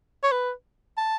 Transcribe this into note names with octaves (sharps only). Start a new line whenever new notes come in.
C#5
B4
A5